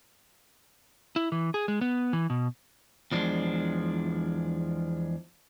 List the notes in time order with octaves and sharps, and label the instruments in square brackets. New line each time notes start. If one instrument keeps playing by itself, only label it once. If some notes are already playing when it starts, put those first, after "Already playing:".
[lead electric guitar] E4
E3
G#4
G#3
B3
E3
B2
[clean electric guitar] E2 F3 G#3 D4